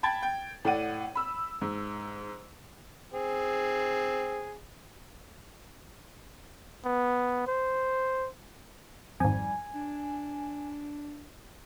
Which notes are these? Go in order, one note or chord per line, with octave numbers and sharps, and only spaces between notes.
G5 A5 B5 G#6 A6
G5
A2 D5 F#5 D#7
B5 E6
G#2
C4 G#4
B3
C5
G#1 F2 G3 G#5
D4